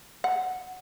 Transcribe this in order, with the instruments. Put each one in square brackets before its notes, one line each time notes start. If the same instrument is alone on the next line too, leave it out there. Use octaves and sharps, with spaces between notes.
[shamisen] F#5